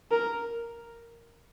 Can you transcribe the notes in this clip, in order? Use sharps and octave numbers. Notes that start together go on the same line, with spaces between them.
A#4